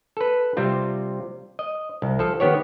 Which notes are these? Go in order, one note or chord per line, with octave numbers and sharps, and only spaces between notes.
A4 B4
C3 G3 C4 F4
D#5
C2
F3 A4
D#3 B3 G4 C#5